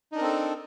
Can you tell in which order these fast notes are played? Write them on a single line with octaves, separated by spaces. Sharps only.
D#4 D4 A#4 C4 A4